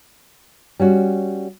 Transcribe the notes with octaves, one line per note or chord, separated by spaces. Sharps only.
G3 C#4 F#4